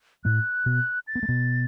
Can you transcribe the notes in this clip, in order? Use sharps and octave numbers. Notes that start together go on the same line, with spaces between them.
A2 A3 F#6
B2 B3
A6
B3
A3
B2 B3